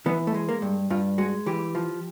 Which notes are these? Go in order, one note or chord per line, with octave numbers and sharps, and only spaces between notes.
E3 B3
A3
G#3
A#3
G2
G2 F4
G#3 F#4
E3 G4
F3